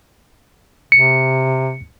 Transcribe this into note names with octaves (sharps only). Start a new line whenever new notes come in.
C3 C#7